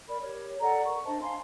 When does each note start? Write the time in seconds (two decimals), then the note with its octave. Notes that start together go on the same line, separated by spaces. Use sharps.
0.08 A#4 D5 B5
0.21 G4 A#4 C#5
0.60 A4 D5 F#5 A#5
0.84 A#4 C#6
1.05 D4 C5 D#5 A5
1.21 F5 G#5 A#5 C6